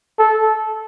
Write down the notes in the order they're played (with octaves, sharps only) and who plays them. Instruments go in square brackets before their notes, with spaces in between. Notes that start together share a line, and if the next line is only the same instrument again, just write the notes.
[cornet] A4